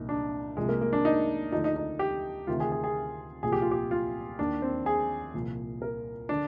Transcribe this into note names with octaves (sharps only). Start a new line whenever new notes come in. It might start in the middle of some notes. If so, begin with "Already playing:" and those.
Already playing: C2 A#2 F3 D#4
D4
C2 C3 F3 G#3
A#3
A#3
D4
D#4
D2 D3 F3 D#4
D#4
D#4
G4
D2 C3 D#3 F4
G#4
G#4
G#4
C2 A#2 F3 G#4
G4
F4
G4
F4
D#2 D#3 D4
C4
G#4
C2 A#2 F3
A#4
D3 D4